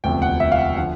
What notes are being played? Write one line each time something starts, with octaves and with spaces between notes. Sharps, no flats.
E1 D2 C3 F3 G5
F#5
E5
F5
F#5
D3 F3 F#5